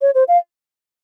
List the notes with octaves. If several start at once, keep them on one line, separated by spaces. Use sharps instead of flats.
C#5
C5
F5